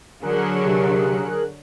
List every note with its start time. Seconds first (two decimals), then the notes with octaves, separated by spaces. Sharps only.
0.22 D3 F#3 G#4 A#4 F#6
0.65 C3